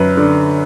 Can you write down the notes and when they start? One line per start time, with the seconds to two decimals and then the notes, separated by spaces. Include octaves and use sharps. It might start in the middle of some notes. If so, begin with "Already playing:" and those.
Already playing: F#2 B4
0.17 D3